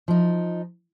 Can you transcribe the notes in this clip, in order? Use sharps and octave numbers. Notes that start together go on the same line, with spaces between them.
F3 D#4